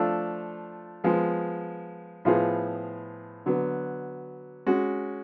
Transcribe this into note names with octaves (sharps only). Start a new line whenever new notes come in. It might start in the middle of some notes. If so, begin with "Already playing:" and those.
Already playing: F3 A3 D4 F4 A4
F3 G#3 B3
A2 F3 B3 F4 G#4
D3 F#3 B3
G#3 C#4 F#4